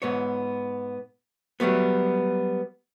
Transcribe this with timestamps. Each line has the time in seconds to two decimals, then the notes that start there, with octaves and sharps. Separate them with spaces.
0.02 G#2 B3 C#5
1.60 F#3 G3 A3 B3